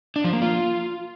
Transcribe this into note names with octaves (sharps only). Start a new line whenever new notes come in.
D4
F3
A#3
F4